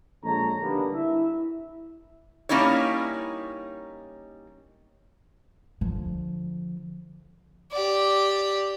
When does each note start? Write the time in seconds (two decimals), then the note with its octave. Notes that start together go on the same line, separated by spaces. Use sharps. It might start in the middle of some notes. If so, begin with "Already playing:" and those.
0.24 A#1 G#3 A4 C#5 A#5
0.60 D3 D#3 G3 A#3 B3 D4
0.94 E4 E5
2.49 G3 A#3 C#4 D#4 E4 C#5
5.81 D3 F3
7.72 G4 D5